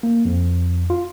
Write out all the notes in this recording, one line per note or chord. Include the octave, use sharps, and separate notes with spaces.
A#3
F2
F4